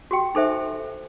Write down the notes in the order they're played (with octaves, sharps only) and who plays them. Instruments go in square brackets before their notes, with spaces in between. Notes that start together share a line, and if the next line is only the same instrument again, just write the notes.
[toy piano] F#4 G4 G5
D#4 A4 C5 E5